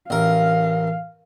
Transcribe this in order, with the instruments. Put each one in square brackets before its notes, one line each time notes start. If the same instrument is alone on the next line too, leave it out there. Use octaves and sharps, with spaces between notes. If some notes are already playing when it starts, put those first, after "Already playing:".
[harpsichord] A1 A#4 [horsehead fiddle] F5